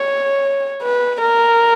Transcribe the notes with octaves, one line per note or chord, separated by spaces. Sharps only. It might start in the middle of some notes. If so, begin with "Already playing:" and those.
Already playing: C#5
B4
A#4